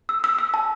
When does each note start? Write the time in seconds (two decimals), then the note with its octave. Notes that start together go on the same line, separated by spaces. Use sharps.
0.09 E6
0.24 E6
0.39 E6
0.54 A5